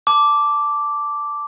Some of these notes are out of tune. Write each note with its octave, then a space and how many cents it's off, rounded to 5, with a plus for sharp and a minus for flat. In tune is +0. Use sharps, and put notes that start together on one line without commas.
A5 +0 D6 -5